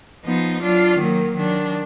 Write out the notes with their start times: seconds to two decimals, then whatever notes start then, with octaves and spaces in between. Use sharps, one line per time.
0.24 F3 B3 D#4
0.62 F#3 D4 F4
0.99 D#3 F#3 A#3
1.36 D#3 F#3 D4